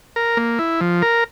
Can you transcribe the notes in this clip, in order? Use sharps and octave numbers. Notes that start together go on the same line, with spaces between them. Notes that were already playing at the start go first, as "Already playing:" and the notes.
A#4
A#3
E4
F3
A#4